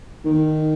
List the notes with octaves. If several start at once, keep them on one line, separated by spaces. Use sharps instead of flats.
D#3